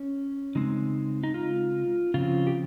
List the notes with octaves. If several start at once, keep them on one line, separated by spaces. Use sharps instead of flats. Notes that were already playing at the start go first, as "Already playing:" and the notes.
Already playing: C#4
C#3 G#3 C4 D#4
D#4
F4
C#3 F3 C4 F4
G4